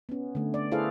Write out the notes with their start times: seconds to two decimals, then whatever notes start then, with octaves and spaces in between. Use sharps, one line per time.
0.09 B3 C#4
0.35 D3 A3
0.54 D5
0.71 E4 G#4 A4 B4 C5 F5